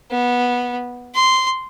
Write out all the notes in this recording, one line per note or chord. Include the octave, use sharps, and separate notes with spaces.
B3
C6